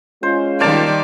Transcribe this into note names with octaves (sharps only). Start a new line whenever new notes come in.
G#3 C#4 F4 C5
D#3 G3 A#3 C5 D5 A5